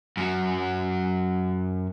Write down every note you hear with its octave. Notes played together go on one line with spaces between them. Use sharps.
F#2 F#3